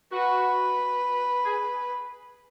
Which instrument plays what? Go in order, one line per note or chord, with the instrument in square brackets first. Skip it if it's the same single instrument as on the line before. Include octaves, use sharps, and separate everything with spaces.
[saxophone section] F#4 [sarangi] B4
[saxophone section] G#4